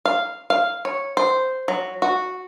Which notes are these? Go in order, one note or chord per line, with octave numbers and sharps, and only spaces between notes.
F5
F5
C#5
C5
F#3
F#4